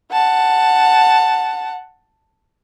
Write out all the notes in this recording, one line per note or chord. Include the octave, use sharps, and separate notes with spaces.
F#5 A5